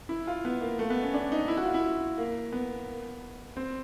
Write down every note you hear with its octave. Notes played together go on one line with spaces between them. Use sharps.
E4
F4
B3
A#3
A3
B3
C#4
D4
D#4
E4
F#4
F4
E4
A#3
B3
C4